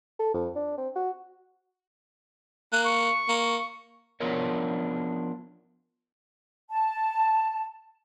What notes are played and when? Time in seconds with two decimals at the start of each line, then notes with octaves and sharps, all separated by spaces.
0.19 A4
0.34 F2
0.56 D4
0.78 C4
0.96 F#4
2.72 A#3 F#6
2.85 C#6
3.28 A#3
4.20 F3 B3 D4 F4 A#4 C#5
6.71 A5